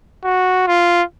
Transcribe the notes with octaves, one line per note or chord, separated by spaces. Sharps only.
F#4
F4